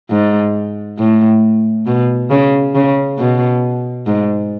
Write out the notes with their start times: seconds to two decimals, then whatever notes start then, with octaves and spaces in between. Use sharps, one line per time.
0.10 G#2
0.98 A2
1.86 B2
2.30 C#3
2.75 C#3
3.19 B2
4.07 G#2